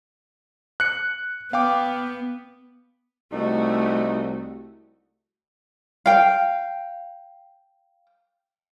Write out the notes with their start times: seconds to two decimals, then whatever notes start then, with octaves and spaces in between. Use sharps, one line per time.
0.80 F#6 C#7
1.53 B3 F5 G5 D6
3.32 C2 A3 D#4 F#4
6.06 F5 G5